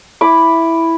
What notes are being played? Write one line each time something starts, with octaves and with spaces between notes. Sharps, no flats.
E4 B5 D6